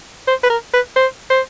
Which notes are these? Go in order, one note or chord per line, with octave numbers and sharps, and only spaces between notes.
C5
B4
A#4
B4
C5
C5